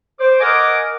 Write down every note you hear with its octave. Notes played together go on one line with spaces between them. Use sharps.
C5 D6
A#4 D#5 F#5 G#5 D6